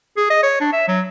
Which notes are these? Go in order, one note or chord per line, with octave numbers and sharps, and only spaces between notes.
G#4
D#5
C#5
D4
E5
F#3